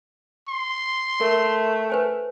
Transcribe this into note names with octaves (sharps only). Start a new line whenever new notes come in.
C6
A3 A#4 E5
B4 C5 G#5